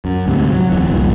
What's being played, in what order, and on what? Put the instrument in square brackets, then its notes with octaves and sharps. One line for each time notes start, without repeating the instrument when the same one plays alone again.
[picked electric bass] F#2
D2 G#2 C3
F#3
D1 F2 E3
F#1 C2 A#2 D#3